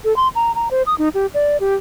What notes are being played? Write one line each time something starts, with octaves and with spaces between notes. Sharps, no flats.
A4
C6
A#5
A#5
C5
D#6
D#4
G4
D5
G4